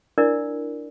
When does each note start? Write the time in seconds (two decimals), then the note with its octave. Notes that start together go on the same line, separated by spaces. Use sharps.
0.18 D4 E4 A#4 D5